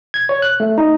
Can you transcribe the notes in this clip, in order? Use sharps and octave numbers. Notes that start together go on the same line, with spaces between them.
G#6
C#5
F#6
A3
D#4